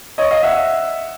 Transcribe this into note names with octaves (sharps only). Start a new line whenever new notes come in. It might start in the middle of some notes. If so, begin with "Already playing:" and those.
C#5 D#5
D#5 F5
E5 F#5